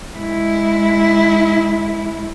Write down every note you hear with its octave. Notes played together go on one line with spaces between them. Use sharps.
G#3 E4